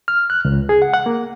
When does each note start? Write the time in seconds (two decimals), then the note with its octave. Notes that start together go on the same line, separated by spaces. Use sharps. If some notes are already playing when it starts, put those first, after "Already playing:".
0.08 F6
0.30 F#6
0.45 C#2
0.69 G#4
0.82 F#5
0.94 F#5
1.06 A#3